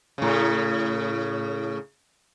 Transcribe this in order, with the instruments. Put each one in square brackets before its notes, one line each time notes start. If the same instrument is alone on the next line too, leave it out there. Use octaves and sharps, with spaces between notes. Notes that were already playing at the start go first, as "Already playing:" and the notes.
[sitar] A2 C#3